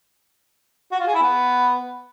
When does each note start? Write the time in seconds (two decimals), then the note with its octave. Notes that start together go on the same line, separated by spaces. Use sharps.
0.92 F#4
0.99 F4
1.07 G#4
1.15 E4
1.22 B3